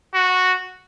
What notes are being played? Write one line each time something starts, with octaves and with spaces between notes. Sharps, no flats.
F#4